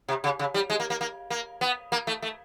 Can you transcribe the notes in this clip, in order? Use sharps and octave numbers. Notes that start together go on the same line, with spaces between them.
C3
C#3
C#3
G3
G#3
A#3
A#3
A#3
A#3
B3
A#3
A3
A3